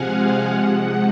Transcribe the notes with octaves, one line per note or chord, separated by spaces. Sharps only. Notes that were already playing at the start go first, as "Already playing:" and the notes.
Already playing: C3 F3 G#3 F5 F#5 G#5
G#5
C3 F3 G#3 F#5